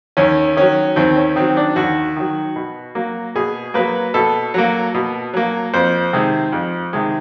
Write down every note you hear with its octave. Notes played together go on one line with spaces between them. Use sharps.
D#2 C#4
D#3 F#3 C#4
D#2 C4
C#4
D#3 F#3 C4
D4
D#2 F#4
D#3 F#3
B2
F#3 A#3
B2 G#4
F#3 A#3 B4
B2 A4
F#3 A#3
B2
F#3 A#3
F2 C5
C3 D#3 G#3
F2
C3 D#3 G#3